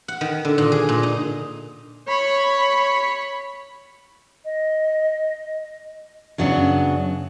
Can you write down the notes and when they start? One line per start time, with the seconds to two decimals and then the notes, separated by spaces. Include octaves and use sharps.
0.08 F#5
0.21 D#3
0.45 D3
0.58 A#2
0.72 G#4
0.89 A#2
1.03 D#4
2.08 C#5 B5
4.45 D#5
6.38 F#2 C#3 F#3 B3 D4